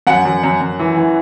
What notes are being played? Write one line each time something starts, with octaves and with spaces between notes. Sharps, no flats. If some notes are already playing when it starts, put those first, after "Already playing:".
F#2 F#5
F#2
F#2
F#2
E3
E3